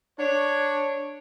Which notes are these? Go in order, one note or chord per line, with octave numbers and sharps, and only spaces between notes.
D4 C#5